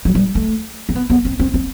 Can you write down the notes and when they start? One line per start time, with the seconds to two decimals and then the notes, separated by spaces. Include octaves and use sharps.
0.05 F#3
0.15 G3
0.35 A3
0.89 C4
0.95 B3
1.10 B3
1.25 C4
1.40 C4
1.54 C4